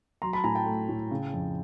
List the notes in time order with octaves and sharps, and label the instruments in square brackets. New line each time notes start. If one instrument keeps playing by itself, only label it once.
[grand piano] F#3 A#5 C6
A5 B5
A2 G#5 A#5
G5 A5
A3
A2
C#3
F2